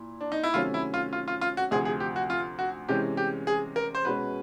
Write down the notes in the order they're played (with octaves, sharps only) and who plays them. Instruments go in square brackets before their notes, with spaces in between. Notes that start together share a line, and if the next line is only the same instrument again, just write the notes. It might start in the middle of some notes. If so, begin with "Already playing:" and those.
Already playing: [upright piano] A#2 E4
[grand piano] D4
D#4
E4
[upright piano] C3 D#3 F#3 A3 C#4 [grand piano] F4
[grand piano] E4
F4
F4
F4
F4
F#4
[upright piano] D2 C3 F3 [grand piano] G#4
[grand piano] G#4
G4
F#4
F4
F#4
[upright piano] C3 E3 G#3 C#4 [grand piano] G4
[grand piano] G4
G#4
A#4
C5
[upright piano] B2 G#3 C#4 [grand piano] B4